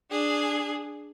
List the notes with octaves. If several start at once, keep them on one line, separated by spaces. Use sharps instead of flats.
D4 G#4